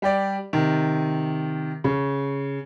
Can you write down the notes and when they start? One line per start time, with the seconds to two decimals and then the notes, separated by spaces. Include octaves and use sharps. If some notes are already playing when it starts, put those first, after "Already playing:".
0.02 G3 G4 D5
0.53 C3 D#3
1.84 C#3